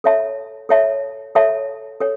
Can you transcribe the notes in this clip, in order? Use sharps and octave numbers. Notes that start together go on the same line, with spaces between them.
A4 C#5 E5 A5
A4 C#5 E5 A5
A4 C#5 E5 A5
A4 C#5